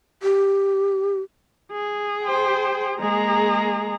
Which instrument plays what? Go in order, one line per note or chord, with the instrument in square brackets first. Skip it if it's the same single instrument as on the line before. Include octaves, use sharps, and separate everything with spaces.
[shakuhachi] G4
[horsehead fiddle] G#4
[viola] C5 G5
[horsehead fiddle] G#3 G#4 [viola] A#3 A#5